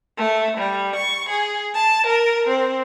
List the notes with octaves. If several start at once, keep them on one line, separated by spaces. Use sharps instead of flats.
A3
G3
C#6
G#4
A5
A#4
C4